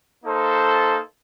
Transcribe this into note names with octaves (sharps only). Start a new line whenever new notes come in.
A#3 D#4 A4 C5